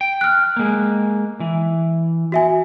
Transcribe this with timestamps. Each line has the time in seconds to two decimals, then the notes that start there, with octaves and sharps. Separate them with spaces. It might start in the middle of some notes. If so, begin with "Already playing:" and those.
0.01 G5
0.21 F6 F#6
0.56 G#3 A#3
1.40 E3
2.32 F#4 E5 G#5